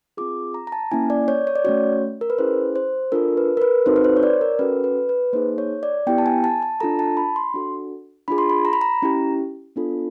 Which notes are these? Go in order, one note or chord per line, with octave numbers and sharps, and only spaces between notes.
C4 F4 G#4 D6
A#5
A#5
A5
A#3 C#4 E4 G#5
D5
C#5
C#5
D5
A3 C#4 F#4 C#5
A#4
B4
C#4 E4 G#4 C5
C5
D4 F4 A4 A#4
B4
A#4
B4
C4 D#4 F#4 A4 C5
B4
C5
C#5
D5
A#4
C#4 F#4 A4 B4
B4
B4
A#3 D#4 G#4 C5
C#5
D5
B3 E4 G4 G5
A5
G#5
A5
A5
D4 F4 A4 A#5
A5
B5
C6
D4 F#4 A4
D4 F4 G#4 B5
C6
B5
A#5
B5
A#5
C#4 E4 G4
B3 D4 F4 A4